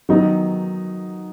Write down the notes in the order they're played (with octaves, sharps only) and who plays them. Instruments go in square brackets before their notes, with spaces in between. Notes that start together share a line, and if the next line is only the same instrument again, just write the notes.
[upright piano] D#3 F#3 B3 D#4